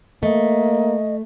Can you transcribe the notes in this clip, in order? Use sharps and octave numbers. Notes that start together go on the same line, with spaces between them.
A3 A#3 D#5